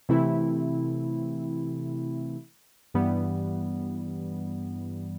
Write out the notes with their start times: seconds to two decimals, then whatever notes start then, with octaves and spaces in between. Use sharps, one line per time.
0.09 C3 E3 A3 C4 E4
2.94 G2 E3 G3 B3